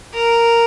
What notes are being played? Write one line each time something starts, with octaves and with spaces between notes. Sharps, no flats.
A#4